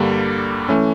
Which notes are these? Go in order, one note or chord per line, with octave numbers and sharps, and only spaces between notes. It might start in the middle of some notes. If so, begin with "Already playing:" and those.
Already playing: G2 D3 G3 A#3
E3 A3 C#4